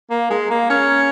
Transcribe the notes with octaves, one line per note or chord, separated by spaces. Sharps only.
A#3
G#3
A#3
C#4